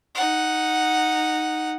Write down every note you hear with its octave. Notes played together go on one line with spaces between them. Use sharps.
D#4 F#5